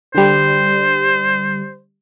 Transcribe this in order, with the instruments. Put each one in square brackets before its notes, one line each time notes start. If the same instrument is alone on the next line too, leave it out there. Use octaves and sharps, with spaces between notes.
[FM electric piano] D3 G3 [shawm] C5